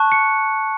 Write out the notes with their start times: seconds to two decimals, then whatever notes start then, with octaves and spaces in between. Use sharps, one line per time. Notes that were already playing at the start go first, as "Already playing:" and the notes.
Already playing: A5 C#6 F#6
0.12 C#7